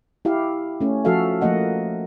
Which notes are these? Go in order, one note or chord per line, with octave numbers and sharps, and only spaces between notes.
E4 G4 F5
A3 C#4
F3 F#4 A4 E5 F5
F3 A3 A#3 D#5 F#5